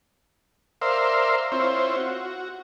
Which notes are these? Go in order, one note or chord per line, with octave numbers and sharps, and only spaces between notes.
A#4 C5 D5 E5 F5 C6
C4 E4 F4 C5 C#5
F#4